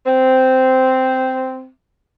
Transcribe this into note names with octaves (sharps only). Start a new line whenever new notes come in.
C4